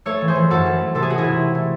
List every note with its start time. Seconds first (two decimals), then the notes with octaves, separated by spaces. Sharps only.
0.06 A3 A4 C#5
0.21 E3
0.28 G#4 C5
0.35 E3
0.50 F#2 F#4 A4
0.66 E3
0.80 A3
0.95 C3 A4
1.03 G#4
1.10 A3 F#4
1.18 E4 G#4
1.24 C3
1.40 A3
1.55 A3